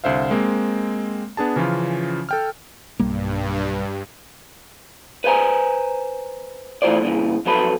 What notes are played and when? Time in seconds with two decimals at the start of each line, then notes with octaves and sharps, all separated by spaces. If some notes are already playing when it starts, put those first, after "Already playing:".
0.04 C2 D3 C5 E5 F5
0.31 G#3 A#3 C4
1.37 B3 D4 G#4 A5
1.56 C#3 E3 F3 C#4 F4
2.29 A4 G5 F6
3.00 B1 G2 G3 A#3
5.24 B4 C5 E5 G#5 A#5
6.82 E3 A3 F4 C5 D5
7.01 G2 A#2 C#3 E3
7.46 F2 F#3 A4 B4 B5